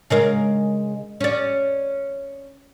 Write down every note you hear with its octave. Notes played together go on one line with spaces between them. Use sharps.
C#3 G#3 A#4
C#4 D5